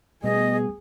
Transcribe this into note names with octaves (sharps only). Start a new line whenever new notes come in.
B2 G3 A3 B3 G#4 D#5